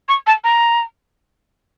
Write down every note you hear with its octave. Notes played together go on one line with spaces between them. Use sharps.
C#6
A5
A#5